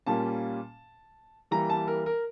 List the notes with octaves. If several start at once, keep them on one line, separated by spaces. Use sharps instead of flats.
A#2 G3 A#3 C#4 A5
E3 G3 A#3 A#5
A5
A#4
A#4